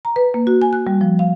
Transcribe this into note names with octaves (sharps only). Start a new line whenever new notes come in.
A#5
B4
A#3
F#4
G#5
F#6
G3
F3
F5